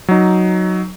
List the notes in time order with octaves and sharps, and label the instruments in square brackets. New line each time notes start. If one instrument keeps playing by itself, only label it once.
[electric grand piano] F#3 D#4